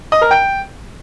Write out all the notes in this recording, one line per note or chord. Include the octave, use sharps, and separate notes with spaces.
D#5
A#4
G5